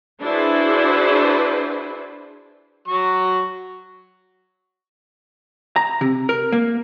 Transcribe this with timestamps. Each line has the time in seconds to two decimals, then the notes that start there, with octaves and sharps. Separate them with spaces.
0.21 D4 E4 F#4 G#4 B4 C5
2.88 F#3 C#6
5.76 A#5
6.01 C3
6.29 A#4
6.52 A#3